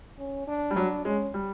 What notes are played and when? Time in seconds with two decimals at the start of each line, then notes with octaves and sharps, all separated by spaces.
0.18 C#4
0.48 D4
0.71 G3
0.76 F#3 D4
1.05 G#3 C#4
1.34 G3